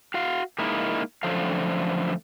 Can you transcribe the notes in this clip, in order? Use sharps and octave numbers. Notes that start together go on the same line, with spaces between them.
F#4 F5
G#3 A#3 D#4 E4
F#2 D3 F3 A3 F5